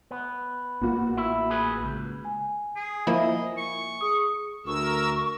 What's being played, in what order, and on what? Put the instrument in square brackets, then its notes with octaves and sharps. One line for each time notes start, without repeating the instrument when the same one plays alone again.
[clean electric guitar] B3
[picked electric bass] A1 A#3 [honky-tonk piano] A#2 F#4
[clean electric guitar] E4
G#4 B4
C#2
[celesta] G#5
[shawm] G#4
[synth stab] F3 A#3 E4 [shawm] D#5
[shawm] C#6
[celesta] G#4 D#6
[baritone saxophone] D2 [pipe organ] A#4 E6 [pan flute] C#6